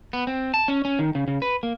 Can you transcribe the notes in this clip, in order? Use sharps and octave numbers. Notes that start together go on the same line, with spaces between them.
B3
C4
A5
C#4
C#4
D#3
C#3
C#3
B4
A#3